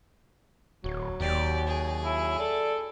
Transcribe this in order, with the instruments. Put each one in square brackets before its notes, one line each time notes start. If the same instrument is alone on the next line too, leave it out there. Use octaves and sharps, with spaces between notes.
[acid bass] D1 [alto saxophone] F#3
[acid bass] D#2 [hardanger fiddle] G4 D5
[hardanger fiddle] G#4
[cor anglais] E4
[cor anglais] A4 [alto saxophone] D5